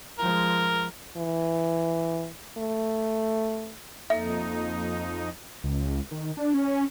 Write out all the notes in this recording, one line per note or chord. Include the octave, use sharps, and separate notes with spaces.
F3 G#3 A#4
E3
A3
F2 A#3 D#4 A4 E5
C#2
D#3
D4
C#4